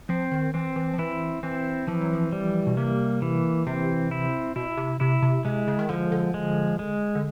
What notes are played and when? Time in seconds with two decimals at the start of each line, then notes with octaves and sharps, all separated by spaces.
0.09 F3 C4
0.32 D#3
0.54 E3 C4
0.76 E3
0.94 F3
0.98 E3 E4
1.43 E3 C4
1.87 E3 F3
2.01 F#3
2.13 F3
2.32 G3
2.67 B2
2.77 C3 A#3
3.22 E3
3.67 C3 C4
4.11 E4
4.56 B2 E4
4.77 C3
5.00 C3 E4
5.22 C3
5.45 C3 G#3
5.68 C#3
5.79 D#3
5.89 D3 F3
6.12 D3
6.34 G#3
6.79 G#3
7.15 D3